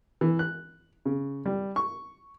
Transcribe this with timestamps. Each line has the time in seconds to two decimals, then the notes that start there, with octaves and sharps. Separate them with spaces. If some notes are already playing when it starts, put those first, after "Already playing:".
0.21 E3
0.39 F#6
1.06 C#3
1.46 G3
1.76 C#6